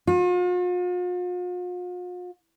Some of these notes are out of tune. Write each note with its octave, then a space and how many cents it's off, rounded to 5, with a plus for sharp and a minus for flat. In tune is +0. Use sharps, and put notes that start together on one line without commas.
F4 +45